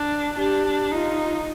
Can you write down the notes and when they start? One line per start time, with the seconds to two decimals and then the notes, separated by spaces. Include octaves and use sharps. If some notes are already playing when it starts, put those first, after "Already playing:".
Already playing: D4
0.38 D4 G4
0.92 D#4 F4